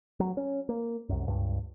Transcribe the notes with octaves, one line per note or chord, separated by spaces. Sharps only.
F#3
C#4
A#3
C2 F#2
C#2 G2